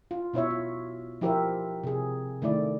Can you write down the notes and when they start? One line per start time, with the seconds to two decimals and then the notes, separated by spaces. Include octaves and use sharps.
0.11 F4
0.33 B2 E4 C#5 E5
0.51 F4
1.21 F3 E4 G4 A#4 C5 E5
1.84 C3 G#4
2.42 D#3 A3 E4 D5